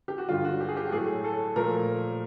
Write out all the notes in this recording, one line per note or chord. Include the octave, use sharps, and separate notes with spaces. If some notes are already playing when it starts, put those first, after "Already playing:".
G4
F#4
G2 D3 G3 F4
F#4
G4
G#4
G4
A2 F#3 A3 G#4
A4
A#2 F3 A3 A#4